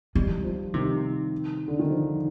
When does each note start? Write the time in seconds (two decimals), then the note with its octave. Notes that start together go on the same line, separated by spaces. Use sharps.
0.15 D#3 G3
0.44 F3
0.74 C3 D#3
1.68 D3
1.79 D#3
1.90 F3